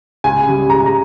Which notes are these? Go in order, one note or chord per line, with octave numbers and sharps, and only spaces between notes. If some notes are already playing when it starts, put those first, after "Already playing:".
C#2 G#5
C#3 G3
C#2 A#5
A#5